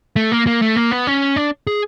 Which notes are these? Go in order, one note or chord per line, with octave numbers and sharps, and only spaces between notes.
A3
A#3
A#3
A3
A#3
B3
C#4
D4
G#4